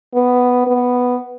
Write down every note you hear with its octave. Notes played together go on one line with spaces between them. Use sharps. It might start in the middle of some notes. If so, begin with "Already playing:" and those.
B3
B3